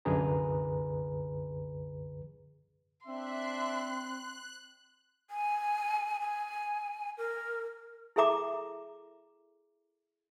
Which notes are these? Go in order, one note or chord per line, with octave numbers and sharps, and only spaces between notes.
C2 F#2 D3 G#4 B4 A#5
C4 D4 E5 C6 F#6
G#5
G#5
A#4
E4 G#4 A4 E5 A#5 D6